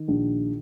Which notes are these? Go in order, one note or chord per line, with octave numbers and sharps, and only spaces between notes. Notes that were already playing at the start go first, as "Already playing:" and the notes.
Already playing: D#3
A#1